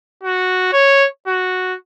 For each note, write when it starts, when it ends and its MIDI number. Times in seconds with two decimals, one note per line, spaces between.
0.23 0.68 66
0.73 1.06 73
1.27 1.75 66